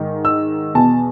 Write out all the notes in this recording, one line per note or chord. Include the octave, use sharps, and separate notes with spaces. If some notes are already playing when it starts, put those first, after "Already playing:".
Already playing: G#2 D#3
E6
E2 B2 A5